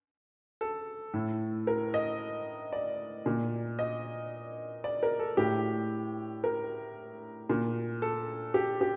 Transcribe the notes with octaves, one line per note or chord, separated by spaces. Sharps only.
A4
A2
A#4
D#5
D5
A#2
D#5
D5
A#4
A4
A2 G4
A#4
A#2
A4
G4
G4